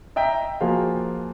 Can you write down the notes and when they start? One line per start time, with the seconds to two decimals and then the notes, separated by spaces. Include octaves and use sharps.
0.16 D#5 E5 G5 A#5
0.61 F3 A#3 F4 F#4 G#4 F5